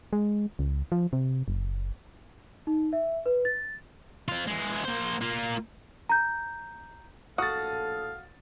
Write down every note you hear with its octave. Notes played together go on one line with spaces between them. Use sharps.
G#3
C#2
F3
C3
F#1
D#4
E5
B4
A6
C4 F4
E3 G#3
A#3 C5
A#3 F4
A#5 G6
A#1 A2 F#4 A4 F5 D#6 A6